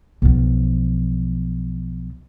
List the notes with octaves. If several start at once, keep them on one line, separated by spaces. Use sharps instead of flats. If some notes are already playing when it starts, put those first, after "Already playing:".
B1 F3